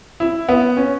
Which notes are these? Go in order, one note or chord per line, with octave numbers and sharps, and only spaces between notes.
E4
B3
C#4